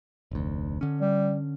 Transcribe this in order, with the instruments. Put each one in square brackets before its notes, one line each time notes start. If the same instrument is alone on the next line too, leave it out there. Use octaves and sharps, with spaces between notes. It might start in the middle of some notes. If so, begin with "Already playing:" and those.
[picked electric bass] F1 D2
D3 C#4
[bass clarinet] G3